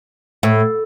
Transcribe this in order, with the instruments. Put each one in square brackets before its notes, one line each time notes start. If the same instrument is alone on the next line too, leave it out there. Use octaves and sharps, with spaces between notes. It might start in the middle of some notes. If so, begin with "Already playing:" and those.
[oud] A2